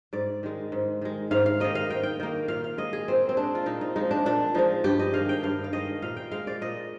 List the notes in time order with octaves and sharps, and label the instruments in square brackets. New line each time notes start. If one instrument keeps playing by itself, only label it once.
[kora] G#2 D5
D#3 G#3
G#2
D#3 G#3
G#2 F5
F5
D#3 A#3 D#5
F5
G#2 G5
G5
D#3 A#3
A#2 F5
F5
G#3 D#5
G#4
A#2 C4
C4
G#3 D4
F4
A#2 D#4
D#4
F3 G#3 D#4
D4
A#2 D4
F3 G#3 D#4
G2 G4
D#5
D#3 G#3 F5
G5
G2 F5
F5
D#3 G#3 D#5
A#2 F5
G5
G#3 F5
D5
A#2 D#5